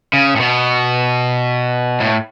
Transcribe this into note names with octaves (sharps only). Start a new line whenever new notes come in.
C#3
A2
B2
A2